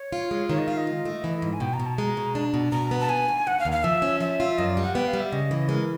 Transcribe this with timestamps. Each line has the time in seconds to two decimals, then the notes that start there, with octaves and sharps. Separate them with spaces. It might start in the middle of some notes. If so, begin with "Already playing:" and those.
Already playing: C#5
0.12 F4
0.31 G#3
0.49 D#3 C#5
0.58 D#5
0.68 F4 F5
0.77 D#5
0.87 G#2
1.05 A3
1.24 E3
1.42 G#2
1.52 G#5
1.60 B2 G5
1.73 A#5
1.79 B2
1.86 A5
1.98 G#3 A#5
2.17 B2
2.35 D4
2.54 B2
2.72 B2 A#5
2.91 B3
3.00 A5
3.09 D#2 G#5
3.28 D#2
3.47 D#2 F#5
3.59 F5
3.65 D#2
3.72 F5
3.83 F3 E5
4.02 C#4
4.20 F3 E5
4.40 F4
4.58 F#2 D#5
4.70 D5
4.77 G3
4.82 F#5
4.95 B3 G5
5.07 F5
5.13 G3
5.20 E5
5.32 C#3 D#5
5.51 E3
5.69 G#3 A#4